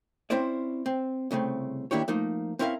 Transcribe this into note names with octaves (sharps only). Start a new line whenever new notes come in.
C4 C#4 E4 C5 D5
C4
C2 C#3 A3 C4
D#3 A#3 D4 E4 G4 C#5
F3 A3 A#3 D#4
C4 C#4 E4 A#4 E5 F5